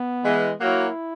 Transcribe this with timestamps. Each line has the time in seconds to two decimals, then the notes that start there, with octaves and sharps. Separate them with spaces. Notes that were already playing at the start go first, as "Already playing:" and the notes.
Already playing: B3
0.24 E3 G#3
0.60 F#3 A#3 E4